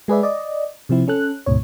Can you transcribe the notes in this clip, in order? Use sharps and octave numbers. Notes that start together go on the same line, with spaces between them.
G#3 G#4 B4 D5 E5
D5 D#5
C3 F3 C4 E4
C#4 A4 F#6
D2 G#2 B2 C#5